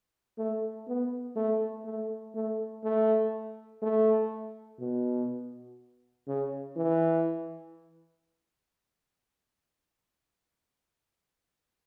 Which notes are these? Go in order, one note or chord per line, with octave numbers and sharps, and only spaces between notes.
A3
B3
A3
A3
A3
A3
A3
B2
C#3
E3